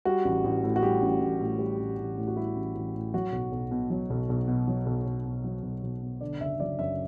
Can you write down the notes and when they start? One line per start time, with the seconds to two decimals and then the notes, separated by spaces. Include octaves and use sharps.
0.05 G3 F#4
0.25 A1
0.44 A1
0.64 A2
0.76 F#4
0.83 G3 G4
1.02 A1
1.21 A1
1.41 A2
1.59 G3
1.79 A1
1.99 A1
2.17 A2
2.28 F#4
2.36 G3 E4
2.56 A1
2.75 A1
2.95 A2
3.14 F#3 F#4
3.33 B1
3.52 B1
3.71 B2
3.90 F#3
4.10 B1
4.29 B1
4.48 B2
4.68 F#3
4.86 B1
5.06 B1
5.25 B2
5.44 F#3
5.63 B1
5.83 B1
6.02 B2
6.21 D3 D5
6.40 F#1 E5
6.60 F#3 D5
6.79 F#2 E5